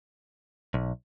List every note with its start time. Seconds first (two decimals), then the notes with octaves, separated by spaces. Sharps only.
0.74 B1